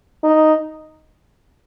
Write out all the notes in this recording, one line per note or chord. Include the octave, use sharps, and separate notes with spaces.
D#4